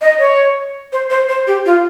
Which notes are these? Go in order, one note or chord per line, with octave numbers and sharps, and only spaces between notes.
D#5
C#5
C5
C5
C5
G4
F4